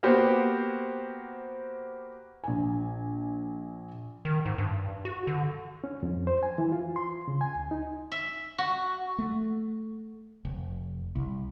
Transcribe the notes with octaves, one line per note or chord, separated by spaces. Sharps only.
A#3 B3 F#4 G4 C5
A#1 G#5
D#3
G#2
G2
F#4
D3
C#4
F2
C5
G#5
E3
F4
C6
C#3
G#5
D2
D#4
E5
F#4
A3
F1
C2